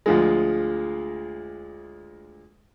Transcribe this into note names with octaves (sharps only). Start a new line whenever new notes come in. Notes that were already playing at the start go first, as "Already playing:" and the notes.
D2 F3 G#3